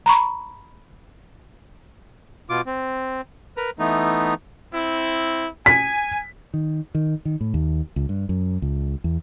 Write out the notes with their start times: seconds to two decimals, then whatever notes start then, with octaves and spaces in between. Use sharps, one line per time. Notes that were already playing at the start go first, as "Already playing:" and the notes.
0.06 A#5 B5 C#6
2.50 B2 F4 D6
2.66 C4
3.57 A#4 B4 A#5
3.79 E3 A3 B3 D#4
4.73 C4 E4
5.66 G#5 B6
6.54 D#3
6.95 D#3
7.25 D#3
7.41 A2
7.54 D#2
7.96 C#2
8.09 G2
8.29 F#2
8.62 C#2
9.04 E2